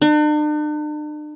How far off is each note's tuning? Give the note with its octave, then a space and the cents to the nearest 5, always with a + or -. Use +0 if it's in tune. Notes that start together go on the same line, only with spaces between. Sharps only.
D4 +45